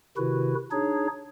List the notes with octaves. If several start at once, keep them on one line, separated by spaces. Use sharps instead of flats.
C3 D#3 E4 F#4 B4
D4 D#4 G#4 C#5